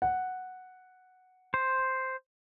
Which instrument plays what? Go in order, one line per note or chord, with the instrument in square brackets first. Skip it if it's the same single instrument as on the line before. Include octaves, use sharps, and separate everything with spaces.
[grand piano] F#5
[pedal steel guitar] C5